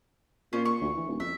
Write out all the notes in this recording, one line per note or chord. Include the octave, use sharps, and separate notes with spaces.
A#2 C#4 F4 C5
C#6
D2
E3
D#1
F2 E5